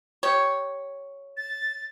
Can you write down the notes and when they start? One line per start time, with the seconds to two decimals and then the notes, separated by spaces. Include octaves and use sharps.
0.23 G4 C#5
1.37 A6